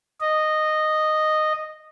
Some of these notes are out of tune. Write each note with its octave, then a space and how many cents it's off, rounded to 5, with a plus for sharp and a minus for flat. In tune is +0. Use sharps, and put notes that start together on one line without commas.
D#5 -10